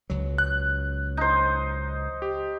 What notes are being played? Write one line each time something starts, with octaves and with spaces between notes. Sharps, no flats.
C#2 F#3
F#6
D#4 C5
G4